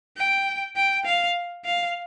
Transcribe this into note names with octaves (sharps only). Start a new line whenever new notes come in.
G5
G5
F5
F5